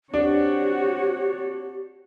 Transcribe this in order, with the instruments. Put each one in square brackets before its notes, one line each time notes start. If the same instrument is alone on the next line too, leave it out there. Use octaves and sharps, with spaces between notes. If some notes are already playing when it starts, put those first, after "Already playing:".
[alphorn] C4 [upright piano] D4 [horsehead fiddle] F#4 C#5 [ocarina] G4